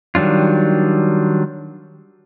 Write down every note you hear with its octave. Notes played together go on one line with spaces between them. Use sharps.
D#3 F#3 G3 D4 F4